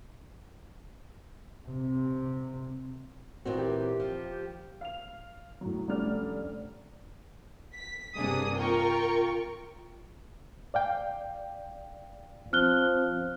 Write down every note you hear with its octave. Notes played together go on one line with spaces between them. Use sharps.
C3
A#2 E3 C4 F#4
G4
F3
F5 F7
A2 F#3
F1 G3 C#4 D4 D5 F6
B6
G2 C3 A#3 D4 G#4 D#6
F4 A#4 G5 C#6
D5 F5 G5
F3 C4 F6 F#6 G7